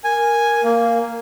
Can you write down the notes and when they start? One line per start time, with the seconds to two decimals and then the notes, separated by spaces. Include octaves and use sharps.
0.04 A#4 G#5
0.64 A#3